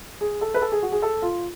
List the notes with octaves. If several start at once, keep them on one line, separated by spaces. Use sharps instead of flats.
G#4
A4
B4
A4
G#4
F#4
G#4
A4
F4